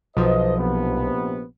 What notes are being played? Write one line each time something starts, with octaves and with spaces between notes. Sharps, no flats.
B1 F3 B4 C5 D#5
A#1 C3 B3